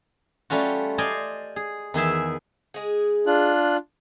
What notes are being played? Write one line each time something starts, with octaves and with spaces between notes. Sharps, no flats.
G3 A3 C#4 F4 F#4
C5 D5 D#5 F5 G#5
G#4
E2 D#3 G#4 E5
G#3 G#4
D4 F4 F#6